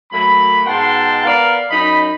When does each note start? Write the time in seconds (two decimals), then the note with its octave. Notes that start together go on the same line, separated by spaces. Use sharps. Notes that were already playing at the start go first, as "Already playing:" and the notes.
0.12 F#3 A3 A#3 B5
0.66 G#2 B2 F#5 G5 A5 C6
1.24 B3 A#4 D5 F5
1.71 F#2 C#4 D#4 D#5 B5